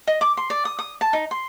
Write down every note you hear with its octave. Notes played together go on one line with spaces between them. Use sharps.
D#5
D6
C6
D5
D#6
D#6
A5
D#4
C6